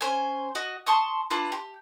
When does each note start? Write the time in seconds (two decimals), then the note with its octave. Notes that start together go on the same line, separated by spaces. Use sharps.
0.01 C#4 C5 G#5
0.55 F#4 D#5
0.86 A5 C6 C#6 D#6
1.30 D4 E4 F4 B4
1.52 G4